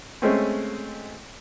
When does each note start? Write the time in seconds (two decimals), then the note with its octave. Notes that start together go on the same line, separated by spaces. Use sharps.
0.22 G#3 A3 C4 C#4